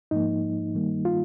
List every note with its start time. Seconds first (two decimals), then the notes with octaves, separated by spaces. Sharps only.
0.11 G#2 F3 A#3 D#4
0.74 G2 D#3 G3 A#3
1.05 F4